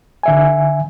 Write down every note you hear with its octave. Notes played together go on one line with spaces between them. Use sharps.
D3 E5 G#5